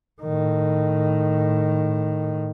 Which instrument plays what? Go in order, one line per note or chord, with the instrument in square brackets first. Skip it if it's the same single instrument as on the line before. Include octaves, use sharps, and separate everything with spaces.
[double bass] A2 D#3